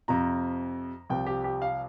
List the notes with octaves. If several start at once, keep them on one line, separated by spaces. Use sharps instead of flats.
F2 C3 F3 A#5
C2 C3 F3 G5
G4
G4
F5